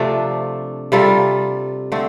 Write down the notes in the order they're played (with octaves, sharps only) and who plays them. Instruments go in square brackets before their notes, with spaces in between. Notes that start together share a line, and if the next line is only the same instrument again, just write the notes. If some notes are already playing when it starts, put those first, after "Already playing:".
Already playing: [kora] C3 F3 A3 D4
C3 G3 F4 A4
D3 A3 C4